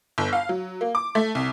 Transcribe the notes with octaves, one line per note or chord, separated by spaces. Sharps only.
G1
F5
F#3
A#3
D6
A3
C2